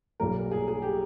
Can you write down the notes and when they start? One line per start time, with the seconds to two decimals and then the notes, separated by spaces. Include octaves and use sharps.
0.20 B1 A#2 G3 A#3 A#4
0.51 G#4
0.68 G#4
0.82 G4